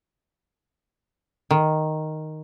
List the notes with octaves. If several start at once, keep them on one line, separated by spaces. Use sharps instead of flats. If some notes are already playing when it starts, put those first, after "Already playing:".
D#3